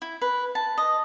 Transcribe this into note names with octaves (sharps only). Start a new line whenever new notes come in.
E4
B4
A5
D#5